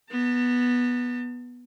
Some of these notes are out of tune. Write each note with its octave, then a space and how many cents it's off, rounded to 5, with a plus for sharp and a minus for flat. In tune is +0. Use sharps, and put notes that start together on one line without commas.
B3 -10 A5 +35